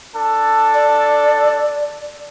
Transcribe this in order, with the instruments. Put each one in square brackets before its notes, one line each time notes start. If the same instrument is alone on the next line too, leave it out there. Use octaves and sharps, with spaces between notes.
[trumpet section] D4 A4
[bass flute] D5